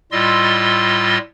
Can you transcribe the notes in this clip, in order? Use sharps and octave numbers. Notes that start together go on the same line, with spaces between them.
A2 G3 F4 D#5 C6 E6